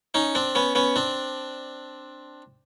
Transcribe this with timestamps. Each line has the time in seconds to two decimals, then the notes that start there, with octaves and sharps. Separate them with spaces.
0.14 C#4 D#4
0.35 C4 D4
0.55 B3 C#4
0.75 B3 C#4
0.96 C4 D4